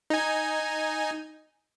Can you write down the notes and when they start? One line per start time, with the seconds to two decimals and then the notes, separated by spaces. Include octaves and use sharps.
0.10 D#4 G#5